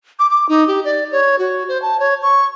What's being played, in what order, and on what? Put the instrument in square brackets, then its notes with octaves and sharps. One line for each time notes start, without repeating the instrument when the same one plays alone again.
[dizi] D6
D6
D#4
G4
D5
C#5
F#4
C5
A5
C#5
C#6